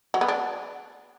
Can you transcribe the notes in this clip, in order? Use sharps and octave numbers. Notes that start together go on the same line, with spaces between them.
F#3
B3
D4